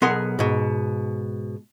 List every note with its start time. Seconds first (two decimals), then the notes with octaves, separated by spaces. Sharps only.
0.02 B1 B3 G#4 A#4 C6
0.39 G#2 B2